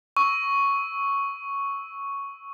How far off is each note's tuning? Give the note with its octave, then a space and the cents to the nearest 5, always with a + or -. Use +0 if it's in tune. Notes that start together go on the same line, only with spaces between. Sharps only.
C#6 +0 E6 -15